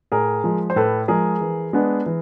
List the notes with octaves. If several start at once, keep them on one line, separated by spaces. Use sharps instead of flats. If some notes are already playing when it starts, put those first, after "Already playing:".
A2 G#4 A#4
F3 G#3
C5
A2 A4 B4
F3 G#3 G#4 A#4
E3
G#3 B3 D4
E3